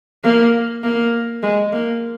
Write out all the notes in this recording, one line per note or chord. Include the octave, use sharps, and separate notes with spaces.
A#3
A#3
G#3
A#3